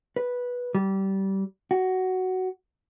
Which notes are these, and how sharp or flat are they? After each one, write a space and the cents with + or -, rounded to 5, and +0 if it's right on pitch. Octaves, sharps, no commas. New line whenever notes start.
B4 -10
G3 -20
F#4 +10